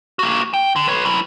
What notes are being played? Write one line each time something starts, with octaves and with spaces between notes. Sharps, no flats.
A#3 F#4
G5
D3
B4 C#5
F#3 E4